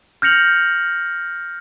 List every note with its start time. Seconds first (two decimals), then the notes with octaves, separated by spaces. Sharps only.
0.22 F6 G6 A#6 C#7 F7 F#7